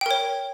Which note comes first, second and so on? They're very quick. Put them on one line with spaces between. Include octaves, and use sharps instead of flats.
G5 A#4 C#5